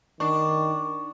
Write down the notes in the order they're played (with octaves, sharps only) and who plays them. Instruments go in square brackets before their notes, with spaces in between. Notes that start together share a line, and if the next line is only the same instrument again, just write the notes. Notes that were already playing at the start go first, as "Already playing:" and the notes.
[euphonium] D#3 [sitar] D4 [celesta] C#6